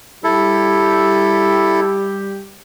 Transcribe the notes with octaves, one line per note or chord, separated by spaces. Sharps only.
G3 E4 G4 A4